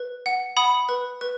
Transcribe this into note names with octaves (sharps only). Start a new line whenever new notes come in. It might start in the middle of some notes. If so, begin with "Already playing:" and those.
Already playing: B4
F#5
F#5 B5 D#6
B4
B4